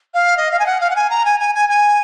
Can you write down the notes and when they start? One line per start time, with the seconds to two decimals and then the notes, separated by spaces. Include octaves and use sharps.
0.14 F5
0.37 D#5
0.51 F5
0.59 G#5
0.66 F#5
0.81 F5
0.90 F#5
0.96 G#5
1.10 A#5
1.25 G#5
1.40 G#5
1.55 G#5
1.69 G#5